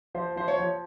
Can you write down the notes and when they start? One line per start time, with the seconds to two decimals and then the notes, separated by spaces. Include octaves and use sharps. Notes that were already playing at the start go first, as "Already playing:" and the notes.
0.15 F3 C5
0.36 F3 C5
0.48 C#5
0.58 F3